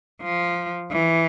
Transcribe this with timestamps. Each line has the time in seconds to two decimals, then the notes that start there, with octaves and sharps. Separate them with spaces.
0.22 F3
0.91 E3